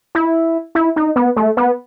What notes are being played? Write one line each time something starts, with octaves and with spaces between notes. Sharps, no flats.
E4
E4
D#4
B3
A3
B3